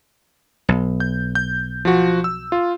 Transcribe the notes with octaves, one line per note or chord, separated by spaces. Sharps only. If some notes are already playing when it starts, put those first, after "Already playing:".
B1
G6
G6
F3 F#4
E6
F4